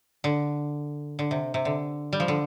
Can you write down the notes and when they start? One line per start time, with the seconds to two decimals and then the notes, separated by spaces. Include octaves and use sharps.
0.24 D3
1.19 D3
1.31 C3
1.54 C3
1.65 D3
2.13 G3
2.20 F3
2.28 D3